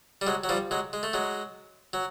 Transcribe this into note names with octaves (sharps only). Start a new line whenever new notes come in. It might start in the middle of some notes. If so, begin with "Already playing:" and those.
G3
F#3 G#3
F#3
F3 G3
F#3 G#3
G#3
A3
F#3 G#3
F#3